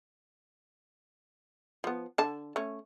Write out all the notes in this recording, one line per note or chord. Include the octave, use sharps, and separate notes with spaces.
F3 B3
D3 A5
A3 C#4